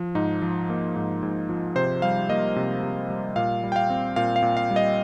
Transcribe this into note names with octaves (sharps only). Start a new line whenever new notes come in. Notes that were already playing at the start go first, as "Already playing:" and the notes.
Already playing: F3
G#2 D#4
F3
A#3
G#2
G#2
F3
C3 C5
G3 F5
A#3 D#5
C3
C3
G3
A#2 F5
G3
G5
F5
C4
A#2 F5
F5
A#2
F5
G3
D#5